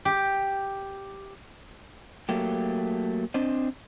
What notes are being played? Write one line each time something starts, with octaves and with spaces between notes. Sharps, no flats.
G4
F#3 A3 A#3 G4
C4 D4 C5 D#5